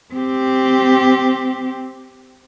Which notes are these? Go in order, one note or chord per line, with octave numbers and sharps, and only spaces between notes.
C4 G4